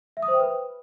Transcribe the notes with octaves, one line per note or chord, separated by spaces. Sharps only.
E5
D#6
C5
G5
B4